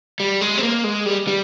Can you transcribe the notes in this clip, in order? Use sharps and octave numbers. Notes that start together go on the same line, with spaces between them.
G3
G#3
C4
A#3
G#3
G3
G3